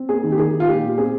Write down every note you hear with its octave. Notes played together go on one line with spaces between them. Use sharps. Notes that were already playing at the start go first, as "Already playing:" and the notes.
Already playing: C4
A#3 G#4
D#3
G4
D#3 G#4
D#3
F4
A#2 G4
A#2
C4 G#4